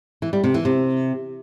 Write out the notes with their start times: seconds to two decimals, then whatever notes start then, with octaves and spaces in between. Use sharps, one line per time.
0.22 E3
0.33 G3
0.44 C3
0.54 E3
0.65 C3